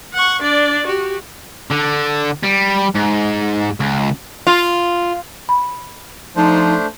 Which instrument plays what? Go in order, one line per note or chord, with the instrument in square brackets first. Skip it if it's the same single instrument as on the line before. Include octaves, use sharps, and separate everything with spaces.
[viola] F#5 C#6
D4 D5
F#4 G4
[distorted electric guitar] D3
G3
G#2
C#2
[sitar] F4
[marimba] B5
[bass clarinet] F3 [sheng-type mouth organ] A3 D4 C5 [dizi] D#4